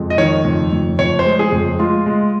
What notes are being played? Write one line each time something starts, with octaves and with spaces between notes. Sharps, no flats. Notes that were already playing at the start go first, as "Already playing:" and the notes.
Already playing: F2 G#3
D#5
D#3 C#5
F2
F2
F2 C#5
C5
G#3
G#4
F2
G#3 F4
G#3